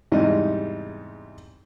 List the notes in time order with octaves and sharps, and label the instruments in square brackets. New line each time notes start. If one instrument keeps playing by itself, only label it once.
[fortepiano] E2 G#2 C3 G3 D#4 D#5